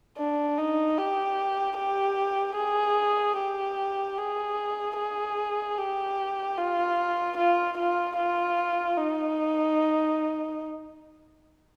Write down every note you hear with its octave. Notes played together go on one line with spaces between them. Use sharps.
D4
D#4
G4
G4
G#4
G4
G#4
G#4
G4
F4
F4
F4
F4
D#4